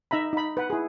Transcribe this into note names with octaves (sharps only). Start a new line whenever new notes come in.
D#4 E5 A#5 B5
D#4 B5
B4 F#5
E4 G#4